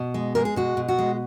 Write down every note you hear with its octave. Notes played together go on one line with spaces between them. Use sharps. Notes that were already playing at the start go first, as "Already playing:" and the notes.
Already playing: B2
G#3
G#3 A#4
G#4
B2 F#4
B2
F#4
G#3